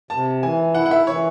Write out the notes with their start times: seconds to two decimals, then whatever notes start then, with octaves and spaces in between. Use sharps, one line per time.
0.10 C3 A5
0.43 E3 G#5
0.75 E4 F#5
0.86 F#5
0.91 E5
1.07 E3 C#5